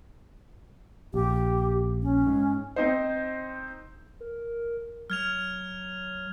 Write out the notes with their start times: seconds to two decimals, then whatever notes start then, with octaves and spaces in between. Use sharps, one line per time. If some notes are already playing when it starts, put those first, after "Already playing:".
1.14 A#1 G4
2.03 C#4
2.27 G#2
2.76 C4 D#4 C5
4.20 A#4
5.10 F#3 F6 G#6 F7